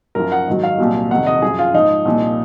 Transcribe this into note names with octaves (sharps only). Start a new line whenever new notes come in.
F#2 F3 A#4
F#5
G#2 D#3 F#3
F5
C2 A#2 F#3
F2 C3 D#3 F#5
D#5
F#2 F3 G#4
F4
G#2 F3 D#4
C2 A#2 F3